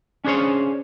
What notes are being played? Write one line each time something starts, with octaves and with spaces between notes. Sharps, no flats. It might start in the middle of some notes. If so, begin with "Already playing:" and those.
C#4 D4 G#4 C5 C#5